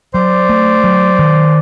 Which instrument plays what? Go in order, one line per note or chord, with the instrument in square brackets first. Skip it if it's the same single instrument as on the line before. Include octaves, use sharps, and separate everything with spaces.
[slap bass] F#3 [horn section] C5 D5
[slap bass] A3
F#3
D#3